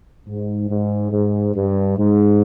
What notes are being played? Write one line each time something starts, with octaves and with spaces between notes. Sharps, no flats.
G#2
G#2
G#2
G2
G#2